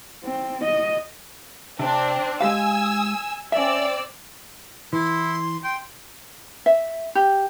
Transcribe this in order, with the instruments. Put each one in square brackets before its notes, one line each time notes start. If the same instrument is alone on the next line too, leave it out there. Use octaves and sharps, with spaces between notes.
[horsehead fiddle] C4
D#5
[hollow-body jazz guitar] C3 [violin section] C4 D4
[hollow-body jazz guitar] G#3 G4 F5 [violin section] G#5 E6
[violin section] C4 D5 E6 [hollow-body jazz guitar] C#4 E5
[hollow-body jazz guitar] E3 [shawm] E4 [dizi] C6
[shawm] G5 [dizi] C6
[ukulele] E5
G4